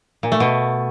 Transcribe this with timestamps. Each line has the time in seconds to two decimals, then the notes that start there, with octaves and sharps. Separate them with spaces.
0.23 A#2
0.32 A3
0.40 B2